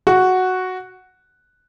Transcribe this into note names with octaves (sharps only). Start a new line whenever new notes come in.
F#4